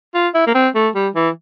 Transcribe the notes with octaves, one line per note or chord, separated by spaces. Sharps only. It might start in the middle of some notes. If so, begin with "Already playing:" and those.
F4
E4
A#3
C4
A3
G3
E3